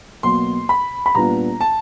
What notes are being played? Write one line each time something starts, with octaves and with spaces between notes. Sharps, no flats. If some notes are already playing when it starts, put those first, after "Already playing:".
B2 F#3 A#3 C6
B5
B5
A#2 G3 B3 D4 F4 A#5
A5